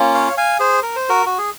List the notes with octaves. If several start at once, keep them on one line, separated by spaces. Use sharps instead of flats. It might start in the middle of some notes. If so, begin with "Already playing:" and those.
Already playing: A#3 C#4 F4
C#5 F5
F5 G#5
G#4 C5
A#4
C5
F#4 A#4
F#4
G#4